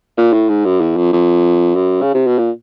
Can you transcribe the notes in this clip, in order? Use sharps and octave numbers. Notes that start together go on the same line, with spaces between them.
A#2
A2
G#2
F#2
E2
F2
F2
F#2
C#3
C3
B2
A#2